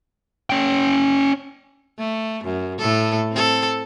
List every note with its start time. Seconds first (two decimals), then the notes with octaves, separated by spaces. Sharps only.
0.50 C#4 G5
1.98 A3
2.44 F#2
2.79 A2 A4
3.32 C4 A4